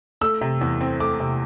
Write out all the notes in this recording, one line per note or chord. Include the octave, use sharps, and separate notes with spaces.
A3 E6
C3
E2
C4
A3 D6
C3